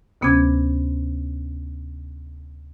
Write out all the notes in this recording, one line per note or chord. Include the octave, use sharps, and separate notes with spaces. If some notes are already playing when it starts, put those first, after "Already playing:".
D2 C3 B3 C#4 D6 G#6